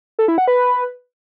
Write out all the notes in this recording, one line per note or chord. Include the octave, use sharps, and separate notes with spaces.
A4
E4
F#5
B4